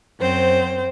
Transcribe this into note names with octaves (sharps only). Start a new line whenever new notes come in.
F#2 C4 C5